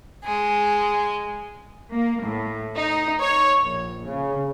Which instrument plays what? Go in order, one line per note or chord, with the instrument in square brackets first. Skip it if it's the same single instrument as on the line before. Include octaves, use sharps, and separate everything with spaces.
[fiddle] G#3 G#4
[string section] A#3
A2
D#4
C#5
A#1
C#3